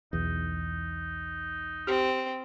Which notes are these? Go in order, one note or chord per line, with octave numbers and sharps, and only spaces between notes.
B1 E2 D#4
C4 G4